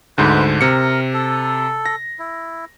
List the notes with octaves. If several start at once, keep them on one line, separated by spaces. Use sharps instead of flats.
D2 G#2 D3 B4 C5
C3 A#4 C#7
A4
A#6
E4